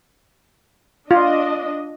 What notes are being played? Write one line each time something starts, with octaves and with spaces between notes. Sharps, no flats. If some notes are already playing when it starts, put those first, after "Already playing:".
D4 F4 D#5